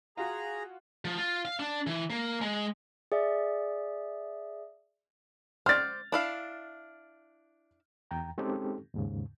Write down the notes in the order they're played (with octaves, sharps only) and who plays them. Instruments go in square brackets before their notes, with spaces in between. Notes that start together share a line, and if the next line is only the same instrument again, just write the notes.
[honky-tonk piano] F4 F#4 [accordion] G#4 A#5
[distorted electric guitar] F3
F4
F5
D4
E3
A#3
G#3
[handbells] G#4 D5 E5
[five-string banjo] C5 D5 [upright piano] F6 A6
[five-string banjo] D4 E4 F5
[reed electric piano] E2 G5 A#5
G#3 C4 C#4 D#4 G4 A4
D#2 G#2 C#3